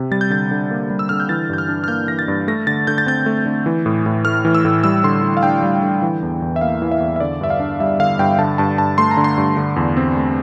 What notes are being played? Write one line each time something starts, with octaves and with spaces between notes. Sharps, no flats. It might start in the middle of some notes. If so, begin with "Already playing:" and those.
Already playing: C3
G3 A6
G6
D3 A6
D3
A#3
G3
E6
D3 F6
G6
E3 A6
G2 G6
F6
D4
F6
A#3 G6
E3 A#6
A6
G2
A3 A#6
D3 A6
D3 G6
A6
C4 G6
A3
D3
E3
A2
A2
A3 F6
E3
E6
A2
G3 E6
D3 C6
D3
F5
D4 G5
G3
D3
E3
E2
E2
E5
A#3 F5
E3
E5
E2
E5
D3 D5
G2 E5
F5
D4
G3 E5
D3 F5
G2 G5
D3 A5
G2 A5
G2 A5
A3 C6
A#5
D3
C6
G2
D3
E2
C4
A3